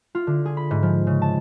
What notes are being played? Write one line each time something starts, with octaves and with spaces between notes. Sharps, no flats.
F4
D3
G#4
B5
G#2
F3
C#3
A5